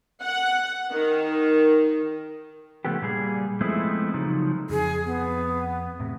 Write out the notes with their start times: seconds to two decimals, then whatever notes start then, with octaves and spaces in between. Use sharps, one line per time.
0.23 F#5
0.92 D#3
2.85 C#3 F3 A3 B3 G4
3.02 A#2 G3 G#4
3.61 F3 G#3 A3 B3 C4 E4
4.14 C#3 F3 F#3 D#4
4.70 F2 G#4
5.04 B3
5.99 E2 A2 C3